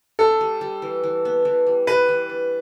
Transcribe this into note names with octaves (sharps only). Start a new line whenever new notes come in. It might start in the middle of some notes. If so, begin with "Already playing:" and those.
D4 A4
G3
G3
E3
E3
B3
E3
G3
G3 B4
E3
D4